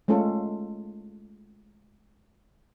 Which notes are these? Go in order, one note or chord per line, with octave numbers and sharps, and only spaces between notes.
G#3 A3 C#4 F4 A4